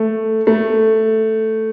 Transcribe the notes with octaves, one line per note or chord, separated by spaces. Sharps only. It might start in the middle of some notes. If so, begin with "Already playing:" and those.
Already playing: A3
A3